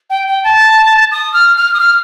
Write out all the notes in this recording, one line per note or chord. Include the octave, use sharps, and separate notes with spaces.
G5
G5
A5
D#6
F6
F6
D#6
F6